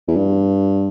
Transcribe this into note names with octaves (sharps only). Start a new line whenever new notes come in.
E2
G2